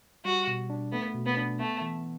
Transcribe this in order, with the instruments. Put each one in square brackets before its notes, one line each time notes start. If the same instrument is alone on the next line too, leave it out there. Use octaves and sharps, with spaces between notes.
[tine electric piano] G3 [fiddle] F#4
[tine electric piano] B2
D4
[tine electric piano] A3 [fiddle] B3
[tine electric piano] B2
[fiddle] B3
[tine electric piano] D4
[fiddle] A3 [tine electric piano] B3
[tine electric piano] E3